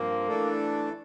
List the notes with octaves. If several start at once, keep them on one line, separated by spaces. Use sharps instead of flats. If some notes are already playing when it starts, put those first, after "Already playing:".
Already playing: G2 F3 A#3 C4
E3 A3 D4 A4